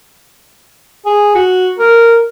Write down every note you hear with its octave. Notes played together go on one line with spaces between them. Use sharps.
G#4
F#4
A#4